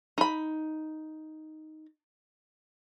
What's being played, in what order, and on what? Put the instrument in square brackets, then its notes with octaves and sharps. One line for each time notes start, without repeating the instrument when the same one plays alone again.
[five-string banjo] D#4 B5